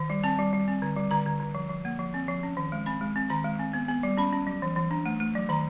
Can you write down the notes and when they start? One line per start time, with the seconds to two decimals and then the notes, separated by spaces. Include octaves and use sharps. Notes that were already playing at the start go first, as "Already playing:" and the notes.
Already playing: D#3
0.10 G3
0.24 C4 A5
0.39 G3
0.53 G3
0.68 C4
0.82 D3
0.96 G3
1.11 D3 A#5
1.26 D3
1.40 D3
1.55 F3
1.69 F3
1.85 A#3
1.99 F3
2.14 C4
2.28 F3
2.43 C#4
2.57 D#3
2.72 G#3
2.86 C4 B5
3.01 G#3
3.16 C4
3.30 D#3 A#5
3.44 G#3
3.60 C4
3.73 B3
3.89 B3
4.03 G3
4.17 C#4 B5
4.33 C#4
4.47 F#3
4.62 E3
4.76 E3
4.91 D4
5.06 A3
5.20 A3
5.35 F#3
5.49 D#3 A#5